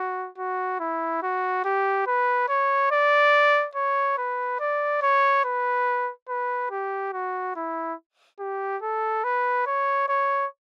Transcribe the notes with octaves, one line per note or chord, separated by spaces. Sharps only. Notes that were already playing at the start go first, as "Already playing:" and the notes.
Already playing: F#4
F#4
E4
F#4
G4
B4
C#5
D5
C#5
B4
D5
C#5
B4
B4
G4
F#4
E4
G4
A4
B4
C#5
C#5